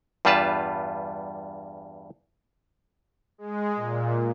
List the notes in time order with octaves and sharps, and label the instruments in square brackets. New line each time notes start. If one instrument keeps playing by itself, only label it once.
[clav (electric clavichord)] E2 G2 G3 F4 B4 A5
[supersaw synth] G#3
A#2